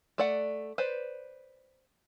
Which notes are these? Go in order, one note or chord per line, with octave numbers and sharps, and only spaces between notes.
A3 D5 F#5
B4 C5 D5